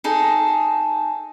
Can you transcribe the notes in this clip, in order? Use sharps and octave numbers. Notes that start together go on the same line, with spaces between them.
D#4 G#4 A4